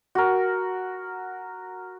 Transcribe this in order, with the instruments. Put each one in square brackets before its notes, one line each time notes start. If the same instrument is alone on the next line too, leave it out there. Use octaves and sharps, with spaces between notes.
[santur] F#4 A#4